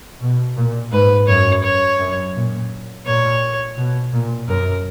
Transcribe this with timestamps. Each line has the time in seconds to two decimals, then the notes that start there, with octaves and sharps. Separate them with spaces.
0.20 B2
0.56 A#2
0.92 G#2 B4
1.27 F#2 C#5
1.63 C#5
1.99 F#2
2.35 A#2
3.06 A#2 C#5
3.78 B2
4.13 A#2
4.48 F#2 A#4